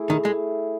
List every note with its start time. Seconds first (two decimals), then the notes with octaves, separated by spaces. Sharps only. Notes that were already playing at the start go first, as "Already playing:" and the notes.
Already playing: A3 E4 G#4
0.10 D#3
0.25 G#3